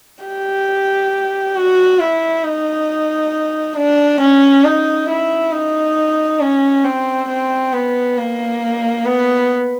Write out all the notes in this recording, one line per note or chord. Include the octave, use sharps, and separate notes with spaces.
G4
F#4
E4
D#4
D4
C#4
D#4
E4
D#4
C#4
C4
C4
B3
A#3
B3